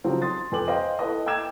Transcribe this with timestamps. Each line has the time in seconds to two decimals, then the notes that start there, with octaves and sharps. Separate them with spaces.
0.04 C#3 F3 F#3 C4 F4
0.21 C6 D#6 A6
0.52 F2 B4 G5 G#5 D6 F#7
0.67 B4 C5 D#5 F5 G5
0.99 E4 A4 B4 D#5
1.26 G5 D6 E6 G#6 E7